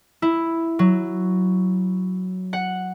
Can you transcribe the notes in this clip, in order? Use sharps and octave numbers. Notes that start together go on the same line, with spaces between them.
E4
F#3
F#5